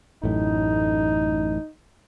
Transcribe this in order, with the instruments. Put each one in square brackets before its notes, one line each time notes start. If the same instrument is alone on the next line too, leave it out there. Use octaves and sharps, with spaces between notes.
[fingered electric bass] A1 F#2 A2 [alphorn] D#4